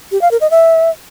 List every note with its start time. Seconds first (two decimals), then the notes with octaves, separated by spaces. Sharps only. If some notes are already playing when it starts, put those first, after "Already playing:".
0.12 G4
0.21 F5
0.31 A#4
0.41 D#5
0.51 E5